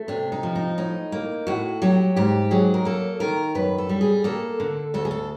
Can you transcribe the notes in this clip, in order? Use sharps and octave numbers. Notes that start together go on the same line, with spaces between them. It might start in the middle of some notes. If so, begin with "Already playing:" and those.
Already playing: A3
C3 D4
D#4
F3
D#4
A2 D#4
A#3
A2 F#4
F#3 G4
G#2 G4
F#3 G#4
A#4
A#3 A4
D#3 A#4
F#2 B4
A4
G3
G#4
A#3 A4
D3
D2 A4
G#4
A4